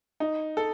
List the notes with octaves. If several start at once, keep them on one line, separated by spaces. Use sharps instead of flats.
D#4
A4